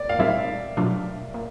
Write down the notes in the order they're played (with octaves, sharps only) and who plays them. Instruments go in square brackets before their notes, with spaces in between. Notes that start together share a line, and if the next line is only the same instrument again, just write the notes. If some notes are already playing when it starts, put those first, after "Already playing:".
Already playing: [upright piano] D5
F5
[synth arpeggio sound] A#2 G3 C4 D#4 G#4 [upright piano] E5
[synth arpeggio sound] B2 F#3 A3 D4 F4
A#2